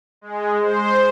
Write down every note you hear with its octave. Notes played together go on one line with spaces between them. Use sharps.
G#3
C5